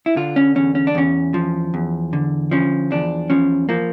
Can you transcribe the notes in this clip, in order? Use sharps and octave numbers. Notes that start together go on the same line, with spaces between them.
E4
D3 F4
C#4
E2 C#4
C#4
D4
E2 C#4
F3
E2
D3
F3 C#4
E2 D4
F3 C#4
F3 A#3